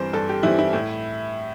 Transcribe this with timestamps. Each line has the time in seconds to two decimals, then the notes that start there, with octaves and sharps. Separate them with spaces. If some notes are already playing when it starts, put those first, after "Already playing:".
Already playing: G2 E3 G3 C4 C5
0.13 G2 A4
0.29 G4
0.43 E3 G3 C4 E4
0.59 E4
0.73 A2